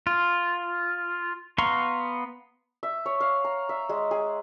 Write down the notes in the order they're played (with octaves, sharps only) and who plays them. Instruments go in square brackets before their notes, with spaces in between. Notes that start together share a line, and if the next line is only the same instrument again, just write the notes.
[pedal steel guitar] F4
B3 F5 A#5 C6 C#6
[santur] E5
C#5
F5
A#5
E5
G#3
G#4